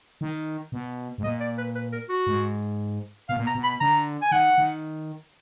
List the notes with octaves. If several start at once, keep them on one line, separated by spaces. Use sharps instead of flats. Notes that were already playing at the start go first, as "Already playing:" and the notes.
D#3
B2
G#2
A#2 D#5
D5
B4
B4
A#4
F#4
G#2
B2 F5
A#2
B2 A#5
B2
B5
D3 A#5
G#5
D#3 F#5
D#3